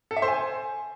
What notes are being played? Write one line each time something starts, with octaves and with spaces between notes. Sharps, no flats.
A4
E5
C5
G#5